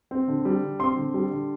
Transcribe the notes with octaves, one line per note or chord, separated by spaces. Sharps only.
C4
D3
G3
D3
C4 C6
D3
G3
D3